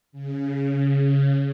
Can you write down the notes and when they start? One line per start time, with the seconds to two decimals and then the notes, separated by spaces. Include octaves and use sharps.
0.12 C#3